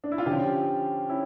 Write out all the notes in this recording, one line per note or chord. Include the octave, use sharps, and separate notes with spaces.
D4
E4
F4
D3 F3 C#4 G4
C#4 E4